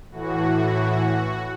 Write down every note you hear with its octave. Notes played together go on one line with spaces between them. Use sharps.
A2 E3 F#4